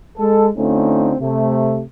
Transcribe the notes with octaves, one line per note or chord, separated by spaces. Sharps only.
G#3 A4
D3 A3 C4 C#4 D#4 F4
C3 A3